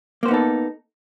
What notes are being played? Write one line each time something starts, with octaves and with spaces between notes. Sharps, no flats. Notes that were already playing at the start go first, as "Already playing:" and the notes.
A#3 B3 D#4 A4 C5